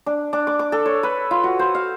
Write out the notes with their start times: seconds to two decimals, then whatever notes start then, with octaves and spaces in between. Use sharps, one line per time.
0.06 D4
0.33 D4
0.47 D6
0.59 D6
0.72 A4
0.86 C#5
1.03 B4
1.31 F4
1.44 F#4
1.59 C5
1.75 F5